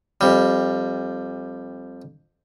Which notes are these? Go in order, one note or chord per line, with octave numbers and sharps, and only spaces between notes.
F2 G3